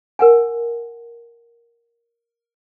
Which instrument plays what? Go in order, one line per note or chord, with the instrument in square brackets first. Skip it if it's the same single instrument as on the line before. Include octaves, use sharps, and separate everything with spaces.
[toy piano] A#4 F#5 G#5